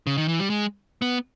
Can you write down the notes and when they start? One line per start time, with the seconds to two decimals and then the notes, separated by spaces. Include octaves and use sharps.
0.07 C#3
0.17 D#3
0.28 E3
0.39 G3
0.50 G#3
1.02 B3